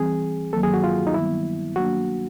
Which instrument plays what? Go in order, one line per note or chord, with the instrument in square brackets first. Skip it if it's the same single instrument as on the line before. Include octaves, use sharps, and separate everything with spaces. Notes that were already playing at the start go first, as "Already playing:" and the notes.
Already playing: [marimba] E3 G3 C4 [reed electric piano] G#4
[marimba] G2 D#3 F#3 A#3 [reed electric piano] A4
[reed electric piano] G#4
F#4
F4
D#4
[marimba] D#3 G3 B3 [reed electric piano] E4
[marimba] F#3 A#3 D4 [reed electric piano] F#4